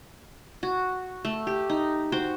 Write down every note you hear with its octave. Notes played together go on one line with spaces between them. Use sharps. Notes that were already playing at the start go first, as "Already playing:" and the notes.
F#4
A3
G4
D#4
F#4 C5 G5